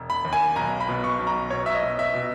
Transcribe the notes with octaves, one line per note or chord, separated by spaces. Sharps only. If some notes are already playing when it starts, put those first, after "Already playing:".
Already playing: E1
B5
D#2
G#5
B1 A#5
B5
B2
C#6
B1
A#5
B2 C#5
E5
D#5
B2
E5
B2